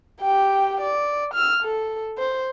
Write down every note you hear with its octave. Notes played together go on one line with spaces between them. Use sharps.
G4 G5
D5
E6 F6
A4
C5